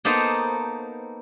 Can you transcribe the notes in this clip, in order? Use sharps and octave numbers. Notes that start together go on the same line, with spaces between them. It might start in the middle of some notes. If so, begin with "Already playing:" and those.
A#3 B3 D#4 A4 C5